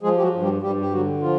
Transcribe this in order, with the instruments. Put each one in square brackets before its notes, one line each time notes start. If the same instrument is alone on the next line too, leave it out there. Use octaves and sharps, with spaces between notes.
[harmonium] F3 G#3 G#4
G4
F#3 F#4
G2
G3 G4
G2 G3 G4
G4
D3 F#3 F#4
F3 F4